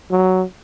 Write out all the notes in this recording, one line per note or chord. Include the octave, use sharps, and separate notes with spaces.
F#3